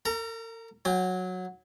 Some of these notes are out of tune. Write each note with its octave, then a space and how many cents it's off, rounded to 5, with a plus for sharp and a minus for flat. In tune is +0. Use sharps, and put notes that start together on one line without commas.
A#4 -45 A#5 +0
F#3 -10 G5 +35